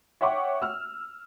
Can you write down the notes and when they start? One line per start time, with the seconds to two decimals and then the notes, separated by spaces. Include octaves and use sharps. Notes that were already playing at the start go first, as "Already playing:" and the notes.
0.21 C#5 E5 F#5 G5 C#6 D6
0.62 E6 F6